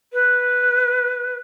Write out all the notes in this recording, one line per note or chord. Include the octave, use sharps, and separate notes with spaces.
B4